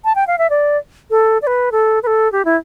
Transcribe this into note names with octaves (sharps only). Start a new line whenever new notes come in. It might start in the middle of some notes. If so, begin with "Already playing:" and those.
A5
G5
F5
E5
D5
A4
D5
B4
A4
B4
A4
G4
E4